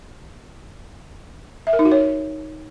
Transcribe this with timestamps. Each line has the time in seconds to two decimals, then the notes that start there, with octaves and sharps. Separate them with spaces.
1.67 E5
1.73 A#4
1.79 D#4
1.85 F#4
1.92 C#5